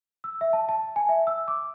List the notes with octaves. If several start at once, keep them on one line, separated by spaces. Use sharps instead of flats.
E6
E5
A5
A5
G#5
E5
E6
D6